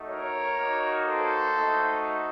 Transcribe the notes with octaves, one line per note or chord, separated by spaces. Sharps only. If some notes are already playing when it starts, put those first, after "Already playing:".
Already playing: A3 D#4 F#4
A#4 C#5
A#3 D#4 F#4
A4 C5
A3 D#4 F#4